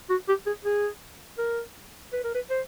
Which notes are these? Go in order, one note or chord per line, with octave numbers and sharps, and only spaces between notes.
F#4
G4
G#4
G#4
A#4
B4
A#4
B4
C5